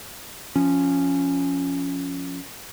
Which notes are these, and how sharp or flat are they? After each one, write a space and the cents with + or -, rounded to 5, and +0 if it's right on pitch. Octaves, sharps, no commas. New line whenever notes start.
F3 +0 C#4 +0